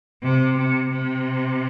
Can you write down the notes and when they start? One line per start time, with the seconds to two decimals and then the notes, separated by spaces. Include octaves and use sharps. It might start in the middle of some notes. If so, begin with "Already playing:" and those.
0.23 C3
0.57 C3
0.90 C3